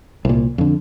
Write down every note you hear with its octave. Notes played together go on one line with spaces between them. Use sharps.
C2 A#2
F2 D3